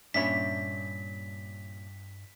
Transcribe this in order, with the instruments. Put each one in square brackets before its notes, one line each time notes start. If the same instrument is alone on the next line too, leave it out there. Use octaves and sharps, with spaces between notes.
[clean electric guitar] G2 E5 B5 [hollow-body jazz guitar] A#2 C#4 D4 [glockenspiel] B6